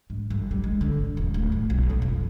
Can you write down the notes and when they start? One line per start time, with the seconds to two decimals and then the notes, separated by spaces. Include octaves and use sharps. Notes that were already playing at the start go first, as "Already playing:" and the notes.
0.10 G#2
0.30 G1
0.51 G3
0.64 G#3
0.81 D3
1.01 G#2
1.17 E1
1.34 D1
1.52 A2
1.70 B1
1.90 F4
2.02 F2